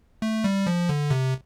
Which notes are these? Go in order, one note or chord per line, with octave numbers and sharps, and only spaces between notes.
A3
G3
F3
D3
C3